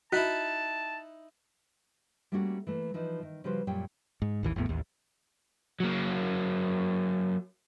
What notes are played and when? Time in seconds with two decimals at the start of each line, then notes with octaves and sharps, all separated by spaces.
0.12 D#4 E4 F#4 A5 F#6 B6
2.32 G3 A3 A#3 C#4 F4 F#4
2.67 E3 A3 A#3
2.94 E3 F3 D#4
3.23 D#3
3.44 C#3 F3 G3 F#4 B4 C5
3.67 F#2 A#2 G3 C#5 G5
4.22 G#2
4.43 A1 D#2 E3
4.56 G#1 E2 A2 B3
4.69 A1 D#2
5.80 F#3 A#3